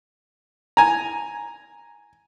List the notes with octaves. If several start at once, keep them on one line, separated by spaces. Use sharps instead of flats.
G#5 A#5